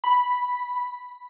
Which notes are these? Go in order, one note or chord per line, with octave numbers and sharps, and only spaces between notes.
B5